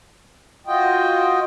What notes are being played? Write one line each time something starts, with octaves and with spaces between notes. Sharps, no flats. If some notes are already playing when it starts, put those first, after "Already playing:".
F4 F#4 D#5 G5